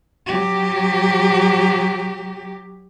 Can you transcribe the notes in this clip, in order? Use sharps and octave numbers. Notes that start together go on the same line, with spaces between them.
F#3 G4